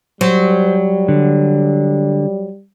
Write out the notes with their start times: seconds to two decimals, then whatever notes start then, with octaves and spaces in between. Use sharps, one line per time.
0.21 F#3 G3 C5
1.08 D3